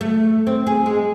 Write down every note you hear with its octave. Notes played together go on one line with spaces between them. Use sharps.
A3
C4
G#4
G#3